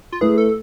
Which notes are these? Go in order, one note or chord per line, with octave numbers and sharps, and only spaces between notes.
F4
A3 E4 G#4 B4
A4